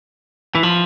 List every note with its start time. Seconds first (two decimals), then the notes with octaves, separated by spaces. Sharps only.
0.55 E3
0.63 F3